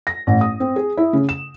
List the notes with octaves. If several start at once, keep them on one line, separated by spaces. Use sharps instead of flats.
A#6
A1
D#6
C4
G#4
E4
C#3
E7